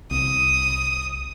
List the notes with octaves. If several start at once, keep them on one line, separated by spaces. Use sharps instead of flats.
C2 D#6